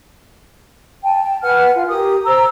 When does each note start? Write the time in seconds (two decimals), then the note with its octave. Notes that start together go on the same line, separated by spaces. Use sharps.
1.04 G5 A5
1.42 B4 F#5 G#5 F6
1.74 F4
1.87 G4 A#4 D#6
2.25 C5 A#5 E6